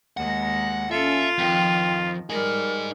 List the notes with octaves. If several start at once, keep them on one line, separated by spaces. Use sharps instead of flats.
D#2 G#3 F#5
C#4 F4 A4 E5
F2 D#3 F3 G5
G3 D#4 G#4 A#4